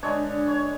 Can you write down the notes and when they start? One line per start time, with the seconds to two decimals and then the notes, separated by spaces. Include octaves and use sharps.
0.03 D3 G#3 D4 C#5
0.48 C#5